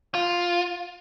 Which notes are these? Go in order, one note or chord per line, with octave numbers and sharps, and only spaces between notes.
F4